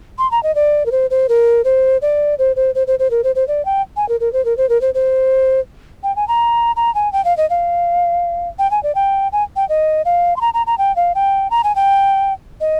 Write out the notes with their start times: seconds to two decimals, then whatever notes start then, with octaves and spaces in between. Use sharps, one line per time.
0.18 C6
0.31 A#5
0.43 D#5
0.55 D5
0.86 A#4
0.92 C5
1.10 C5
1.29 A#4
1.64 C5
2.02 D5
2.39 C5
2.56 C5
2.75 C5
2.87 C5
2.99 C5
3.11 A#4
3.24 C5
3.36 C5
3.48 D5
3.65 G5
3.96 G#5
4.09 A#4
4.20 A#4
4.33 C5
4.45 A#4
4.57 C5
4.69 A#4
4.81 C5
4.94 C5
6.03 G5
6.16 G#5
6.28 A#5
6.76 A#5
6.95 G#5
7.13 G5
7.25 F5
7.37 D#5
7.50 F5
8.59 G5
8.71 G#5
8.83 D5
8.95 G5
9.32 G#5
9.56 G5
9.69 D#5
10.05 F5
10.36 C6
10.41 A#5
10.54 A#5
10.67 A#5
10.78 G5
10.96 F5
11.15 G5
11.51 A#5
11.64 G#5
11.76 G5
12.61 D#5